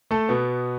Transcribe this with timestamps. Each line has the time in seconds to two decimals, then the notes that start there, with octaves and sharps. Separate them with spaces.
0.11 A3 A4
0.29 B2 B3